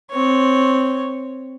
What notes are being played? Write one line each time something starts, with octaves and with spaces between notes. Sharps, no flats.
C4 C#5